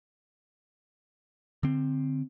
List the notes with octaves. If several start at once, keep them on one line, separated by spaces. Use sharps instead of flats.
D3 C4